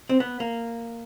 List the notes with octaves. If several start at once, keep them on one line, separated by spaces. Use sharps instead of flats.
C4
B3
A#3